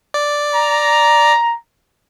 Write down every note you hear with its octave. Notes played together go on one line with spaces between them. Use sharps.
D5
A#5